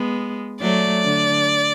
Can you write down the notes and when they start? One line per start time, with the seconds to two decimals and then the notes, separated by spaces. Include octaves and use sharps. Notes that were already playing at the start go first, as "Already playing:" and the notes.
Already playing: G#3 B3
0.61 F#3 A3 D5
1.05 D3